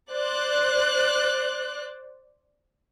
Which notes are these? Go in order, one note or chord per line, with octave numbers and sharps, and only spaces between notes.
C5 D5 F#6